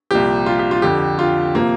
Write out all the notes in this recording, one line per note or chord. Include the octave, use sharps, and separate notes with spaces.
C2 A#2 F3 G4
F4
G4
F4
F2 D3 F3 G4
F4
C3 F3 A#3